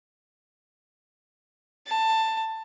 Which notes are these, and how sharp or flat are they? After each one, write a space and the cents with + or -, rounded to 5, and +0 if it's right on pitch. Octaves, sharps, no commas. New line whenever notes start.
A5 +15